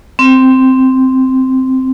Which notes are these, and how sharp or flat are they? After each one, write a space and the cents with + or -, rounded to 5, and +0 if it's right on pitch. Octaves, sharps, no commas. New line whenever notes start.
C4 -5